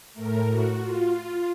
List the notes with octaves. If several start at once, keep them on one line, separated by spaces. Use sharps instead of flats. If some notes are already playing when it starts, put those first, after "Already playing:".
A2 A3 A#4
F#4
F4